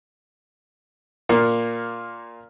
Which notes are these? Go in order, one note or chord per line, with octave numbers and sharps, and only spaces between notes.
A#2 A#3